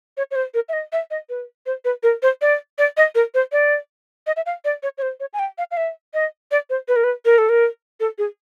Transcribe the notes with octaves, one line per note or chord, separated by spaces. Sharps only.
C#5
C#5
C5
A#4
E5
D#5
E5
D#5
B4
C5
B4
A#4
C5
D5
D5
D#5
A#4
C5
D5
D#5
E5
F5
D5
C#5
C#5
C5
C#5
G#5
G5
F5
F5
E5
D#5
D5
C5
B4
A#4
B4
A#4
A4
A#4
A4
G#4